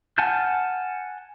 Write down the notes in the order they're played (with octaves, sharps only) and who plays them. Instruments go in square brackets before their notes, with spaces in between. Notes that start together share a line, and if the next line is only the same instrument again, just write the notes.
[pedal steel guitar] F#5 G#5 A5 F6 G6